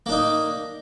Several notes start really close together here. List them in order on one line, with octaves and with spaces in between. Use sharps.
A#3 D4 D#4